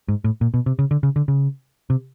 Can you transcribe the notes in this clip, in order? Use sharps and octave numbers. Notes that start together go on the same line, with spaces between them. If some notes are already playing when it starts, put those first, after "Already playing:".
G#2
A2
A#2
B2
C3
C#3
D3
C#3
D3
C#3
C3